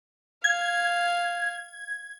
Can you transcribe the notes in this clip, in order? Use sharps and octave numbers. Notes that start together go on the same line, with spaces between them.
F5 G#6